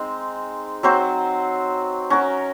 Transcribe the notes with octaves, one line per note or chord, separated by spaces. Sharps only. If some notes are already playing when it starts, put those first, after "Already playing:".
Already playing: G#3 C4 D#4
F#3 C4 F#4 C5
C#4 F#4 A#4